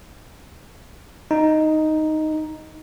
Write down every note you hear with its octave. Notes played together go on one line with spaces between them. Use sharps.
D#4